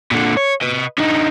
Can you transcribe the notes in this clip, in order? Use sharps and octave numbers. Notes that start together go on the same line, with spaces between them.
A#2 D3
C#5
B4 D#5
D3 D#4